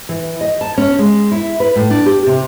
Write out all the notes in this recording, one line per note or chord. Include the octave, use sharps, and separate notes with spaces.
E3
D#5
A5
C#4
G#3
E4
B4
A2
D4
G4
C3